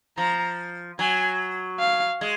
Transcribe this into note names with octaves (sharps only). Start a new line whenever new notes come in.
F3 A#5
F#3 G#5
F5
G#3